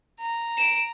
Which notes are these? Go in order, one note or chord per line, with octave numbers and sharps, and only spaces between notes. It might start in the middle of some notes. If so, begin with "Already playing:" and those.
A#5
D7 E7